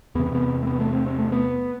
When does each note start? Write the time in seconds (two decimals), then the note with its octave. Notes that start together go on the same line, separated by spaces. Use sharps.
0.15 E2 C3 B3
0.35 B3
0.63 A3
0.67 B3
0.80 A3
0.93 C4
1.06 C4
1.19 A3
1.32 B3